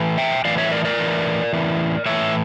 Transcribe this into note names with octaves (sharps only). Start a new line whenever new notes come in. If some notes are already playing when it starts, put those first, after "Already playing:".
Already playing: A2 E3
E5 G5
A2 E3 D5 F5
C#5 E5
A#4 D5
A#4 D5
A2 E3
A2 E3
A2 E3 C#5 E5